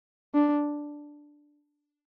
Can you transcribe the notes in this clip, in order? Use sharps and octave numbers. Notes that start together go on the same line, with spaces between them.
D4